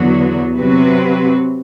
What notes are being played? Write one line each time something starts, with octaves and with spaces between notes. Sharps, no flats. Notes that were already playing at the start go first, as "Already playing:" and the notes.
Already playing: E2 D3 F#3 B3 F#4
C3 F#3 C4 F#4 B4